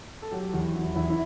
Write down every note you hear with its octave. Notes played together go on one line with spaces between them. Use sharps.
A4
F#3 G4
E2 F#4
F#3 E4
E2 E4
E4